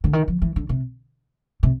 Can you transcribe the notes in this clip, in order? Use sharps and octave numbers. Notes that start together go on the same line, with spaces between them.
D3
D#3
F3
E3
D3
C3
C3